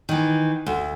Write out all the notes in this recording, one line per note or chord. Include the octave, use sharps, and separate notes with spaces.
D#3 E3
D2